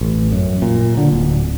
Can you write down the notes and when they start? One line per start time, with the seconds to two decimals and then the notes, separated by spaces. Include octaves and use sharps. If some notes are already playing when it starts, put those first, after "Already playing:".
0.01 A1
0.32 F#2
0.62 A#2
0.97 D3
1.13 D1